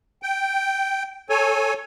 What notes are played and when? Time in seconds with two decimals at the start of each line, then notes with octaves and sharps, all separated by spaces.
0.23 G5
1.30 A4 C#5 G#5